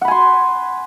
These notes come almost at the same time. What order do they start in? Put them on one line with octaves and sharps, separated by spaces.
F#5 B5 G#5 C6